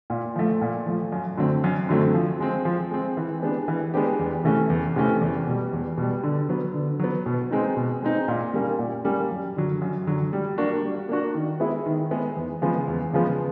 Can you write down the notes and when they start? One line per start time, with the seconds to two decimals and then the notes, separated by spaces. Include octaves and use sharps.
0.10 A#2
0.36 F3 A3
0.61 A#2
0.86 F3 A3
1.12 F#2
1.37 D3 F#3 A3 C4
1.64 F#2
1.89 D3 F#3 A3 C4
2.14 F3
2.40 G#3 C4
2.65 F3
2.91 G#3 C4
3.17 E3
3.42 G#3 B3 D4 G4
3.68 E3
3.94 G#3 B3 D4 G4
4.19 E2
4.44 C3 E3 A3 C#4
4.70 E2
4.96 C3 E3 A3 C#4
5.21 E2
5.47 B2 G3
5.73 E2
5.98 B2 G3
6.23 D3
6.49 F#3 B3
6.74 D3
6.99 F#3 B3
7.26 B2
7.51 G#3 C4 D#4
7.77 B2
8.02 G#3 C4 D#4
8.28 A#2
8.54 G3 A#3 C#4
8.79 A#2
9.04 G3 A#3 C#4
9.31 F#2
9.56 D3 F#3
9.82 F#2
10.07 D3 F#3
10.33 G3
10.58 A#3 D4 F#4
10.83 G3
11.09 A#3 D4 F#4
11.34 D#3
11.60 G#3 B3 E4 G#4
11.86 D#3
12.11 G#3 B3 E4 G#4
12.37 E2
12.62 C#3 F3 G#3 B3
12.88 E2
13.13 C#3 F3 G#3 B3